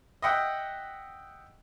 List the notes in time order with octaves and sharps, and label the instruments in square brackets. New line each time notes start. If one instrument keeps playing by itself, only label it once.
[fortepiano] D#5 E5 F#5 G5